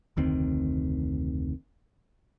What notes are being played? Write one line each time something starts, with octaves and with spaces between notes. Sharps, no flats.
F1 D2 D#3 C4